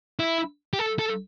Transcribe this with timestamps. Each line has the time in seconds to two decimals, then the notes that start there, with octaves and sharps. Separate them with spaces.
0.19 E4
0.73 G4
0.79 A4
0.99 A4